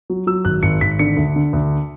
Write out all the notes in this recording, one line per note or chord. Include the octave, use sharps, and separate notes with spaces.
F#3
F#3 E6
G#1 F#6
G#1 C#7
G#1 B6
D3 C#7
D2
D3
D2